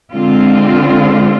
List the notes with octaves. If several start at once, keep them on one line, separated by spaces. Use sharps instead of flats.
D3 G#3 C4 F4